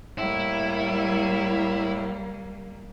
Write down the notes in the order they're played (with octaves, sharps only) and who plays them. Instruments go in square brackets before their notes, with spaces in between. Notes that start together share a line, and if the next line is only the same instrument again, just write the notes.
[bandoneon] A2 [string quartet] G3 A#3 [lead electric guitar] E4